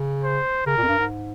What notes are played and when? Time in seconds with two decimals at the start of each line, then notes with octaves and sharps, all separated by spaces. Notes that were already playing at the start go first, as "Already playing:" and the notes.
Already playing: C#3
0.24 C5
0.67 C#3 A#4
0.78 A#2
0.83 F2
0.88 G2
0.99 G#2